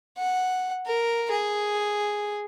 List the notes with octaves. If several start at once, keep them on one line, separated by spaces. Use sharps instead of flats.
F#5
A#4
G#4